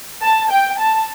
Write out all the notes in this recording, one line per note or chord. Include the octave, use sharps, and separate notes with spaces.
A5
G5
A5